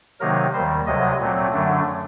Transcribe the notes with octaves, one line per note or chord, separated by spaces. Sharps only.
C3 D#3 F#3 A#3 D#4 A#4
D#2 D#3 G3 C5
D2 C3 F#3 D#5
A#2 F#3 A3 C4
F#2 D3 F#3 A3 D4